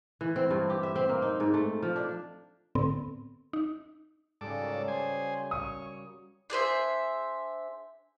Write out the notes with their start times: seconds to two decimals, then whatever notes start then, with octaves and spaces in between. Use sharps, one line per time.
0.21 E3
0.36 C4
0.51 G2
0.70 G4
0.83 E5
0.96 C4
1.09 A#3
1.22 D#4
1.40 G#2
1.54 A3
1.83 F3
1.96 D4
2.75 A2 D3 B3 C4
3.53 D#4
4.41 G#2 C#3 G3 A4 D6
4.60 F#3 A#3
4.88 G#4 C5 G#5
5.51 C#5 D#6
6.50 D4 G#4 C5 E5